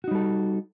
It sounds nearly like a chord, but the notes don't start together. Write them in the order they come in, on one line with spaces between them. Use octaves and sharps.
F#4 D#4 G3 A4